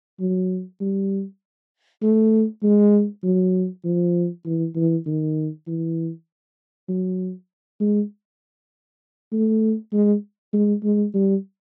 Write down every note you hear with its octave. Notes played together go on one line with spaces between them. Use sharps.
F#3
G3
A3
G#3
F#3
F3
E3
E3
D#3
E3
F#3
G#3
A3
G#3
G#3
G#3
G3